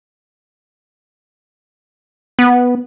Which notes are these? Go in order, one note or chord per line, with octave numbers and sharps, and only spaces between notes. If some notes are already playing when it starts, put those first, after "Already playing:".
B3